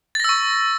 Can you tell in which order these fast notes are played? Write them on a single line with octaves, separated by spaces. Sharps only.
A6 A#6 E6 C#6